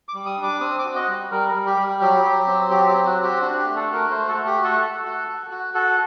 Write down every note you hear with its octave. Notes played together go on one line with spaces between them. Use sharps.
D6
G3
D#6
D4
D6
C4 D#6
D6
F#4
D#5
G3
G3 A#4
A#4
G3
G4
G3
F#3 G4
F#3
C4
F#3 G4
C4 G4
F#4
F#4
G4
D4 F#4
G4
A3
A4
F#4
A#4
A3 C5
A4
A3
G4
F#4
A4
F#4
F#4
F#4
F#4
F#4 A4